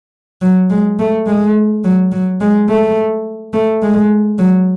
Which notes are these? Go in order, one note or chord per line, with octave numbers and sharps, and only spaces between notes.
F#3
G#3
A3
G#3
F#3
F#3
G#3
A3
A3
G#3
F#3